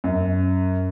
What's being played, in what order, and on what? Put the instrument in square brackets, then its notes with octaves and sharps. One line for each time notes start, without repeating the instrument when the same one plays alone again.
[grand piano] F#2